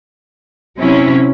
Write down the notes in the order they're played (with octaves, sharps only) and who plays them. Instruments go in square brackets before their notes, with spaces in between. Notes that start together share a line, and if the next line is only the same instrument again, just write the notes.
[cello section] C3 F#3 C#4 E4